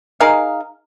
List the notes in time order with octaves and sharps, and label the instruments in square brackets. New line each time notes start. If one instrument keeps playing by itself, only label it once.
[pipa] D#4 G#4 A#4 F5